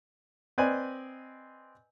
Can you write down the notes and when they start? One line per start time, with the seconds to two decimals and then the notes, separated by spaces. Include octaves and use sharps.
0.58 C4 B4 D5 D#5 G#5